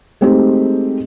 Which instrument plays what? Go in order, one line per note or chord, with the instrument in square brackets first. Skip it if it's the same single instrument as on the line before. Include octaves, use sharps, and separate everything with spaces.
[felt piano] G#3 A3 C4 D#4 G4